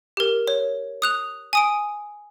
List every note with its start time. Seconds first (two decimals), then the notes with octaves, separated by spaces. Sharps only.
0.17 G4 A#4
0.48 C#5
1.02 D#6 F#6 F7
1.53 G#5 D#6 D7